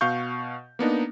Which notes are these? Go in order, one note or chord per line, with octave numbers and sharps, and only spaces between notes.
B2 F5 C#6 G6
A#3 B3 D4 D#4